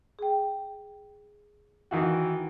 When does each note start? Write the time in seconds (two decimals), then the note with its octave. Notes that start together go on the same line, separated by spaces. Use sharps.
0.19 G#4 G5
1.91 D#3 E3 F#4